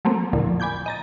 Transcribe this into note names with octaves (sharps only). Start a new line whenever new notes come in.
F#3 A3 A#3 C4
E2 A#2 D3 F3
G#5 B5 D6 G6 G#6
D#5 A#5 A6